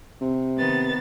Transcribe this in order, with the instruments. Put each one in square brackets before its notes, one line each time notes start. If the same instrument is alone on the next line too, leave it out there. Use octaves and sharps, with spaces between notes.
[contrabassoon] C3
[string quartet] D#3 B3 A6